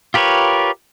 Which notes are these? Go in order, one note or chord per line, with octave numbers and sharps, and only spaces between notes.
F4 G4 A#4 B4 C#5